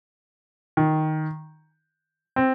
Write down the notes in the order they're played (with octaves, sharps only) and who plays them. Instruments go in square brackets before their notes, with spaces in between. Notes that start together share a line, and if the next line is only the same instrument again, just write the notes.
[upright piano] D#3
C4